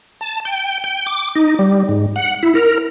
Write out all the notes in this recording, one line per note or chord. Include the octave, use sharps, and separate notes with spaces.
A5
G5
G5
D6
D#4
G3
G#2
F#5
E4
A#4